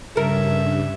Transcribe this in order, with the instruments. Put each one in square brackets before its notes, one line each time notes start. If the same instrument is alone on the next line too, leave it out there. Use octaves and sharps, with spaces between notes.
[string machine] G2 [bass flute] C#3 [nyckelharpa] C#4 E5 [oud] A4 A#4